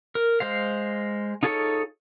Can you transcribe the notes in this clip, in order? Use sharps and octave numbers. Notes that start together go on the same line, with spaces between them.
A#4
G#3 C5 F5
D#4 F4 G#4 A4 C#5